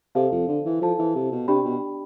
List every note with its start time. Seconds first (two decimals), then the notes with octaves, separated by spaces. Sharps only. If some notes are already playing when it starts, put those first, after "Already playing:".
0.15 C3 A4 C5 F5 A5
0.32 F2
0.48 D3
0.65 E3
0.81 F3 A4 C5 F5 A5
0.99 E3
1.15 C3
1.32 B2
1.48 C3 D4 G4 D5 G5 B5
1.65 B2